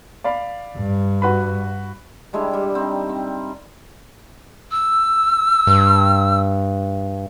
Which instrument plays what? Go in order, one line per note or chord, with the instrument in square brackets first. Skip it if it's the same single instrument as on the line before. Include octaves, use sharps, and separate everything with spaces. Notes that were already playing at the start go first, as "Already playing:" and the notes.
[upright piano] D5 F5 B5
[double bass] G2
[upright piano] F#4 B4 B5
[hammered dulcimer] G3 G#3 D4 E4
G3
C4 D#4
C4
[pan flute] E6
[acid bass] G2